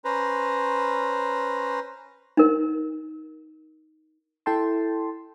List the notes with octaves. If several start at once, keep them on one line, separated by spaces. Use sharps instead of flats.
C#4 B4 C5 A#5
D#4 A#4
E4 A4 G5 A5 C6